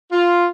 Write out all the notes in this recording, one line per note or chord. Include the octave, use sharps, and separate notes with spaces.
F4